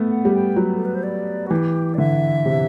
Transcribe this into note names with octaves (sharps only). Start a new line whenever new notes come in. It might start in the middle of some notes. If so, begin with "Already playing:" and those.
Already playing: A3 B3
F#5
G3
G5
F#3
A4
B4
C5
D5
F#4
E3 G4
D5
D3 E5
C3